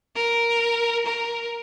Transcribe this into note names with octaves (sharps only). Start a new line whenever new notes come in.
A#4
A#4